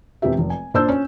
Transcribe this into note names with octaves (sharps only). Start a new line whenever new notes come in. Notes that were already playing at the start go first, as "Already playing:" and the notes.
E1 E3 C4 G4 E5
F1
G#5
A#2 D4 C5 A5 E6 G6
C#4